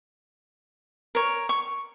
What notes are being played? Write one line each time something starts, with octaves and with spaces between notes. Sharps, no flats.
A#4 C#5
C#6